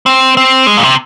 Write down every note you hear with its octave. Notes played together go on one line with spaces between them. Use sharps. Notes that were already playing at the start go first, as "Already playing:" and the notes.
C4
C4
G#3
A#2
C3